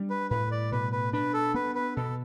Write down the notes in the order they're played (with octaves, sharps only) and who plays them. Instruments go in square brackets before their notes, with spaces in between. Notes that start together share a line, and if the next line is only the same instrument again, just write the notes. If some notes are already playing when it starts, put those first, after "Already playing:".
Already playing: [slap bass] G3 D4
[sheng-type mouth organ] B4
[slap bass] A2 [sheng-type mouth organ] B4
[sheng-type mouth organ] D5
[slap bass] B2 [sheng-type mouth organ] B4
[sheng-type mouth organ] B4
[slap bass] D4 [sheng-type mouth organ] B4
[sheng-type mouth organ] A4
[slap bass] B3 [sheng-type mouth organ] B4
[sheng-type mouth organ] B4
[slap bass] B2 [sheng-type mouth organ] A4